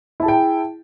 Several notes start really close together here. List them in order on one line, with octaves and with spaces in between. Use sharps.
E4 A5 G#4 G5